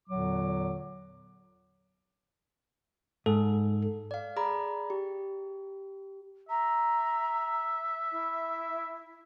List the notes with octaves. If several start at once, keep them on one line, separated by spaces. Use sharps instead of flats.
E2 A#2 D3 F#3 D6
G#2 A4
D5 F5
G#4 D5 A#5 B5
G4
E5 A#5
E4